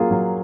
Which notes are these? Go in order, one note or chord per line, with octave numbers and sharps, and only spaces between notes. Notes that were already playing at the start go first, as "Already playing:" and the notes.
Already playing: F#3 A#3 F4 G#4
F#3